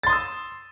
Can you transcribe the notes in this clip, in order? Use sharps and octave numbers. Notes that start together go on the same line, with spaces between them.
C6 D#6 E6 A6